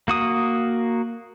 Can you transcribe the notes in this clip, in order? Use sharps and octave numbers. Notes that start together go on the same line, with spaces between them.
A#3 F#4 D#6